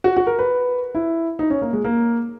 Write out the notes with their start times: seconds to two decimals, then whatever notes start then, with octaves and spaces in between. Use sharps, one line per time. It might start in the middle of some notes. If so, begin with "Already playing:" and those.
0.04 F#4
0.17 F#4
0.27 A#4
0.39 B4
0.95 E4
1.39 D#4
1.50 C#4
1.62 A#3
1.73 G#3
1.84 A#3